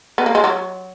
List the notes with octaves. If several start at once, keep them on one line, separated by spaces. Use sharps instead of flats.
B3
A#3
G#3
F#3